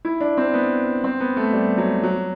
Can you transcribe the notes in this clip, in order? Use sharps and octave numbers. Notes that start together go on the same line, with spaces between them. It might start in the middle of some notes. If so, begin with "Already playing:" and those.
E4
D4
C4
B3
C4
B3
A3
G3
F#3
F#3